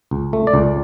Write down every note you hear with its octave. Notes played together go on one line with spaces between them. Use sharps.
C#2
A3
D5
C#2